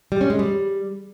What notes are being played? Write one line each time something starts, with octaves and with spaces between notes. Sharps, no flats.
G3
C#4
G#3
G3